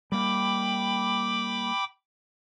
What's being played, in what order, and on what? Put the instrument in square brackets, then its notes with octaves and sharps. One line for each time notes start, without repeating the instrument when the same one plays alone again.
[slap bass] G3 A#3 [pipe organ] G5 B5 D6